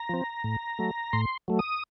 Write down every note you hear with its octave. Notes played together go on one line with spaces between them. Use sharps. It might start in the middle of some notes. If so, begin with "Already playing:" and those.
Already playing: A#5
F3 C4
A2
F#3 A3
A2 C6
F#3 A3
D#6